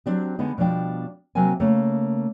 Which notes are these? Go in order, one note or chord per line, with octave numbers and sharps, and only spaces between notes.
F#3 C4 D4 G4
D3 G#3 B3 D#4
B2 F3 G3 D4 G5
C3 F#3 A#3 A#4 G5 G#5
C#3 A3 A#3